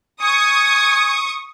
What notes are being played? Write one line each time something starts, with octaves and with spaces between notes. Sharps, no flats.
G#5 C#6 D#6